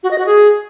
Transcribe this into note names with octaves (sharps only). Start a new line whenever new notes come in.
F#4
D#5
F#4
G#4